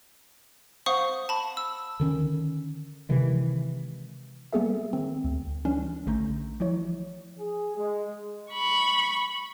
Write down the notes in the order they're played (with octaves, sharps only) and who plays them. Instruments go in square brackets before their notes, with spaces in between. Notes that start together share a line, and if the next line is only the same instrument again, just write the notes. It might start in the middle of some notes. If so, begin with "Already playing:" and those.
[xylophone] C5 F5 F#5 C#6 D#6
A5 B5
E6
[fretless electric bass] D3 D#3 C#4
C3 D#3 E3 G#3
[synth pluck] G3 A#3 B3 G#4 A4 E5
D#3 C4
D2
E3 G3 C#4 D4
A#1 D3 A3 A#5 G6
E3 F3 E4 C#5
[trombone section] G#4
G#3
[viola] B5 C#6